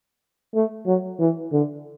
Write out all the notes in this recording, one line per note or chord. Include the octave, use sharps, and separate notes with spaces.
A3
F#3
E3
D3